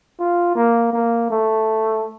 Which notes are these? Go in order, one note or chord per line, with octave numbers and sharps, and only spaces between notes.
F4
A#3
A#3
A3